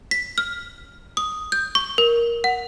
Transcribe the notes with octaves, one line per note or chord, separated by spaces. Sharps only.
B6
F6
D#6
G6
C#6
A#4
F#5